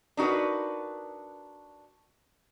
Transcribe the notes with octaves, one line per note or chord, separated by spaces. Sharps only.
D4 D#4 F#4 A#4 B4